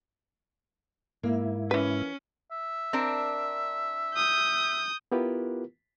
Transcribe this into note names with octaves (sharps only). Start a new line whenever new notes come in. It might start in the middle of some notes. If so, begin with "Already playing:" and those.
G#2 A#3 E4
E3 C#4 B4
E5
C4 D4 A#4
D#6 G6
B3 E4 F4 G4 A#4 B4